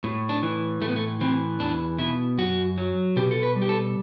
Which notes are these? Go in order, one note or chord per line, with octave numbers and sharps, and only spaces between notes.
A2
D4
E3
A2 A3
B3
A3
E3 C4
E2 D4
B2 E4
F#2 F#4
F#3
B2 G4
A4
B4
G3
G4
A4